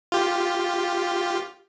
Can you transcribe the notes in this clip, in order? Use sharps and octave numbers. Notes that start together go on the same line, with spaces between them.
F4 G4